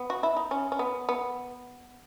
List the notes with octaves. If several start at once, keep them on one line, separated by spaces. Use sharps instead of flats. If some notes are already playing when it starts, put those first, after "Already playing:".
Already playing: B3
F#4
E4
D#4
C#4
C#4
B3
B3